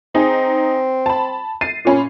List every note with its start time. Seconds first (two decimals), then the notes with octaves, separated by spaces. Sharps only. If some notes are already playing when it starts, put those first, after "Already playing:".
0.15 C4 D#4 G#4
1.06 A5 B5
1.61 A6 C7 D#7
1.85 A#2 C#4 B5